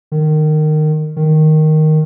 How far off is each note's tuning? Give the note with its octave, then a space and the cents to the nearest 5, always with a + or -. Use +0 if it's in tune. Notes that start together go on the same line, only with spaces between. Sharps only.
D#3 -20
D#3 +0